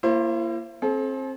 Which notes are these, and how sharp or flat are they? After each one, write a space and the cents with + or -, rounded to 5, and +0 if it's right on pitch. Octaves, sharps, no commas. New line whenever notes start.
A#3 +0 E4 +40 C5 +30
C4 +25 A4 -40